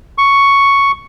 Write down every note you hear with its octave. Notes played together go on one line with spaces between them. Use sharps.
C#6